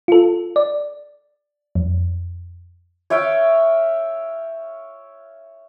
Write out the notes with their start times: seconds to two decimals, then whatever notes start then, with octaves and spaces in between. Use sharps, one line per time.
0.08 F4 A4
0.56 D5
1.75 F2
3.10 C#5 E5 F5 G5